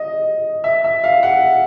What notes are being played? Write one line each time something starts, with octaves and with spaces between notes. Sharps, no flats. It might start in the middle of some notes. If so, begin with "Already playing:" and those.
Already playing: D#5
E5
E5
F5
F#5